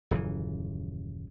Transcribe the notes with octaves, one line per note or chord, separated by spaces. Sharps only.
D#1 F#2 C#3 E3